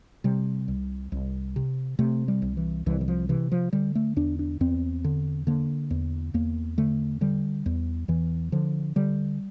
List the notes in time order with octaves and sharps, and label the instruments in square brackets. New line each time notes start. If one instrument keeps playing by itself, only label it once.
[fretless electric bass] C3 G3
C2
C2
C3
C3 A3
G3
C2
E3
C2 E3
E3
F3
C3 E3
F3
D3 G3
A3
E2 D4
D4
E2 C4
D3
D3 A#3
E2
E2 A#3
D3 A3
D3 G3
E2
E2 E3
D3 F3
D3 G3